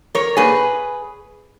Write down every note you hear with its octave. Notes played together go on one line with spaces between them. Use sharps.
A#4 C#5
A#2 G#4 B4